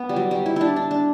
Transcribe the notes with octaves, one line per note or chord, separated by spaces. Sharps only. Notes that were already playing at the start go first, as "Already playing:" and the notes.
Already playing: B3
G3
F#3
G3
E4
D4 E4
D4
D4